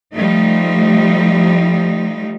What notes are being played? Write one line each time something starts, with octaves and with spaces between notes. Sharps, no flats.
F3 G3 A3 D#4